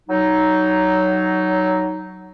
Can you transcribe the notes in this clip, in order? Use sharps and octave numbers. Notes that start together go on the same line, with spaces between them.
F#3 D#4